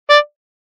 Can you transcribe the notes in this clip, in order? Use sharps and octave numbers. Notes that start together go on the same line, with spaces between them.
D5